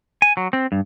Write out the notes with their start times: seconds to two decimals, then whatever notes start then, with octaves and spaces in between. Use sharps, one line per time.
0.22 G#5
0.37 F#3
0.53 C4
0.72 G2